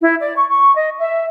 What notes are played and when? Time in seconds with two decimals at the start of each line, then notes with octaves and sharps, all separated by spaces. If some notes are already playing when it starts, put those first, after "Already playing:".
0.01 E4
0.19 D5
0.36 C#6
0.50 C#6
0.75 D#5
0.98 E5